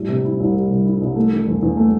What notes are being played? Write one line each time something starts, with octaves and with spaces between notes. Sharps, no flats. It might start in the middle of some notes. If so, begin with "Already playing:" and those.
Already playing: A2 G3
C3
E4
C2
G3
C3
E4
C2
A3
E3
E2
E2
A3